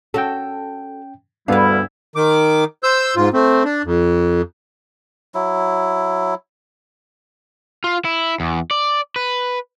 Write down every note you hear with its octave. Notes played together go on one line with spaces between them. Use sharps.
C#4 F#4 A4 G5
D2 G2 G3 B3 D4 E4 B4 F5
D#3 D6
C5 E6 G6
G#2 F4
A3 C4
D4
F2
F#3 E4
F4
E4
E2
D5
B4